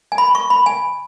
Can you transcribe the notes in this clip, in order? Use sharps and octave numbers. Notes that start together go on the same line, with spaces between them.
G#5
B5
C#6
B5
G#5